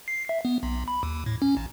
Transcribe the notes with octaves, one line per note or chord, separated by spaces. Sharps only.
C7
E5
B3
B1
B5
D#2
A2
C#4
A1